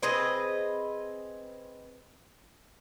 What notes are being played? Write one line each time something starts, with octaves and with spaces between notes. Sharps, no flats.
C4 G#4 B4 D#5